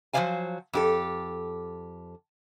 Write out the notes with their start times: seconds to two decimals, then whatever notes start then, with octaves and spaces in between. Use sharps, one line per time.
0.13 F3 F#3 C5 D5 F5 G#5
0.73 F2 G4 A4